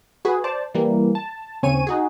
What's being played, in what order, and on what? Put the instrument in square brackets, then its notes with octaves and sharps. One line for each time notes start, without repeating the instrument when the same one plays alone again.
[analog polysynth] F#4 G#4 B4
C5 D5 A5
E3 G3 A#3
A5
D#2 C#3 C4 C#5 G#5 D#7
D#4 F#4 G#4